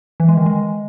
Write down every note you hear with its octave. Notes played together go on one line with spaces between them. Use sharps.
E3
G#3
D#3
G#3